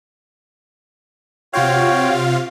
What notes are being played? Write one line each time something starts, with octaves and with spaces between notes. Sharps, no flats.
C3 F4 F#4 C#5 F5 G5